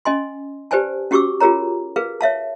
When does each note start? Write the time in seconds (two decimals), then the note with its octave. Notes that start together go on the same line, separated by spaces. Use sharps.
0.05 C#4 D#5 G#5 C6
0.71 G4 B4 C5 D5 G#5 A5
1.11 C#4 F#4 G4 C#6 D6 E6
1.40 F4 G4 G#4 A#4 C#5 A#5
1.96 G#4 A#4 B4 F5
2.21 C#5 E5 F5 A5